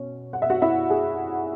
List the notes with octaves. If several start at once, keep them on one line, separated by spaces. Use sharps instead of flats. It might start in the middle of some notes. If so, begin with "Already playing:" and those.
Already playing: B2 C#4
F#5
E5
F#4 F#5
E4 E5
G#4